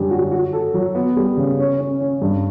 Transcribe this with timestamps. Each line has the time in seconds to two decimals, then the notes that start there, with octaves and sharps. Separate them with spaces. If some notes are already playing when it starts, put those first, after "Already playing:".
Already playing: F#2 D3 G3
0.11 F#4
0.31 F#4
0.53 A4
0.74 F#3
0.95 B3
1.16 G3
1.37 C#3
1.59 C#4
1.80 C#4
2.00 C#4
2.21 G2